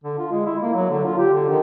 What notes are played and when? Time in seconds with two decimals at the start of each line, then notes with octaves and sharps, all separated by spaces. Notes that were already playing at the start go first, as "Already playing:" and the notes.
0.04 D3
0.18 F4
0.32 G#3
0.46 E4
0.62 A#3
0.74 F#3
0.90 D3
1.04 F4
1.18 G4
1.33 D3
1.48 D#3